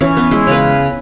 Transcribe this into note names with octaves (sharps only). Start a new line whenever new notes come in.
E3 C#4
B3
G#3 E4
C#3 B4